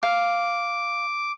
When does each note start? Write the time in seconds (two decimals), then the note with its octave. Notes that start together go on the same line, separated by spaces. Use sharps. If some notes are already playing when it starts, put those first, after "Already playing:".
0.03 F5 D6